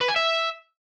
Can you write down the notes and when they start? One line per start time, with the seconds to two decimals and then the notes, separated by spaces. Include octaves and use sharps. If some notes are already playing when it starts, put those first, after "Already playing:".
0.01 B4
0.08 G#5
0.16 E5